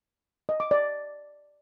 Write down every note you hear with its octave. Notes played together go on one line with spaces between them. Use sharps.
D#5
D6
D5